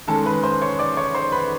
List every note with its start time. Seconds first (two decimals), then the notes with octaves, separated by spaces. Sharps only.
0.08 D#3 G#3 C#4 A4 A5
0.26 B4 B5
0.43 C5 C6
0.62 C#5 C#6
0.79 D5 D6
0.97 C#5 C#6
1.15 C5 C6
1.32 B4 B5